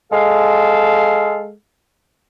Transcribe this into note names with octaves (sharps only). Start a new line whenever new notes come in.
G#3 A4 F5